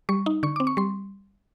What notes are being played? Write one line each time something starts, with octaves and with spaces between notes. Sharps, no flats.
G3 C#6
D#4
D3 C#6
C4 D6
C#6
G3 C6